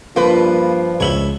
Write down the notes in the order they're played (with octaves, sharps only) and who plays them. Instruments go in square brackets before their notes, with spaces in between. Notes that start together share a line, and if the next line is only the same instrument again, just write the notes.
[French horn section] G2 F3 [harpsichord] A#3 [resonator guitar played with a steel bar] F4 B4
[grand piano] C#2 F#7 G7 [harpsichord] C#5 E5